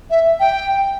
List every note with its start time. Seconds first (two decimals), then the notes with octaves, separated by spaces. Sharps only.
0.10 E5
0.40 G5